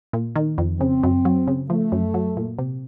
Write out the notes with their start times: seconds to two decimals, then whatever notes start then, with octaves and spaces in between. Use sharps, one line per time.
0.13 A#2
0.36 D#3
0.58 F2
0.80 C#3 C4
1.03 F#2
1.25 F#3
1.47 C#3
1.69 F3 A3
1.92 F#2
2.14 F#3
2.37 A#2
2.59 C3